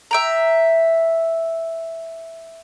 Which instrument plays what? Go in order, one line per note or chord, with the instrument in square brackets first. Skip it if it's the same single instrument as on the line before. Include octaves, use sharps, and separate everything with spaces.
[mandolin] E5 G5 A#5